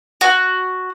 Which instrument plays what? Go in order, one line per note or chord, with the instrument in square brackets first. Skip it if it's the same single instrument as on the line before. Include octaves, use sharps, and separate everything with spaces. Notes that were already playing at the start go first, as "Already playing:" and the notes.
[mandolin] F#4